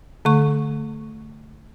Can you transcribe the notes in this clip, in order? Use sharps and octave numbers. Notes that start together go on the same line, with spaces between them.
D3 A3 C#6